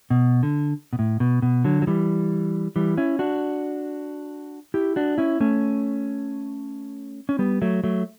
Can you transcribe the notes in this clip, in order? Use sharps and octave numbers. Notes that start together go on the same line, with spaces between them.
B2
D3
B2
A2
B2
B2
D3 F#3
F#3
E3 G3
E3 G3
C#4 E4
D4 F#4
E4 G4
D4 F#4
C#4 E4
A3 C#4
C#4
G3 B3
F#3 A3
F#3 A3